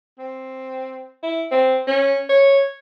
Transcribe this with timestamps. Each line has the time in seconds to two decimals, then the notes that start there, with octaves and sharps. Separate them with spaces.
0.19 C4
1.23 E4
1.51 C4
1.87 C#4
2.29 C#5